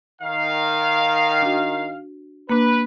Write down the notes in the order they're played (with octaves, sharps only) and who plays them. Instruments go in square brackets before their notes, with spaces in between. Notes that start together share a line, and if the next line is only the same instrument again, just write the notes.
[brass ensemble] D#3 F5
[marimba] D4 F#4
[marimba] A#3 D4 [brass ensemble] B4